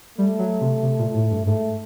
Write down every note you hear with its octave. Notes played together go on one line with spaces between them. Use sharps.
G3 A3
F#3
C3
C3
A#2
A2
G2
G#2 A3